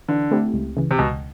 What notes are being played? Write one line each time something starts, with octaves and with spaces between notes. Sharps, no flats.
D3 E3
A3 C4 E4 G4
C#2
C#3 E3
C3
C#2 B2